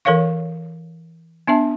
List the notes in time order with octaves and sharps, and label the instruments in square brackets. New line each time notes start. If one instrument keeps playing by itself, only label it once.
[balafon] E3 A4 A#4 C#5 F5 C#6
B3 D4 E5 A5